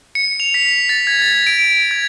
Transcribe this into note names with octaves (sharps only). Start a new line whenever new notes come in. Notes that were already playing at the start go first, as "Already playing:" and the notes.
C#7
F7
B6
A6
G#6
A6
D7
G#6